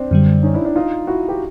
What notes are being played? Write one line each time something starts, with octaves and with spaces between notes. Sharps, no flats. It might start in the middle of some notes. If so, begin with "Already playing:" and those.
Already playing: C4 D4
F#2 D3 G3
C#4 D#4
D4 E4
D4 E4
D#4 F4
E4 F#4
G4